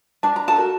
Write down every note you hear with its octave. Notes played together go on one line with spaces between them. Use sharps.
D4 A5
A#5
A4 A5
F#4 A#4